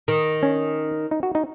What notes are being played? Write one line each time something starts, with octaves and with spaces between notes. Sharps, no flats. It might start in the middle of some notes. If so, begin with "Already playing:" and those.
D#3
C#4
D#4
F#4
D#4